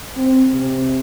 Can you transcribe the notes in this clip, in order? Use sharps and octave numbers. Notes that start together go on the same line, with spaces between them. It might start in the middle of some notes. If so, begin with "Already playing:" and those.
C4
C3